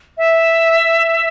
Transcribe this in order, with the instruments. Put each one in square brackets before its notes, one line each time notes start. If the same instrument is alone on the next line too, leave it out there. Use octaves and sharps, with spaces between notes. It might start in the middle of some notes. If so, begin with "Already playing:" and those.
[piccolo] E5